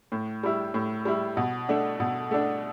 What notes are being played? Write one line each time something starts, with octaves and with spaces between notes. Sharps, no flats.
A2
G3 E4
A2
G3 E4
B2
A3 D4
B2
A3 D4